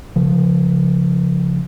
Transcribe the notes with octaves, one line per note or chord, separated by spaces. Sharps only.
C#3 F3